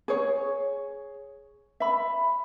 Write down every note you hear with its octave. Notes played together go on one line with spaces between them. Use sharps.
G#4 C#5
E5 B5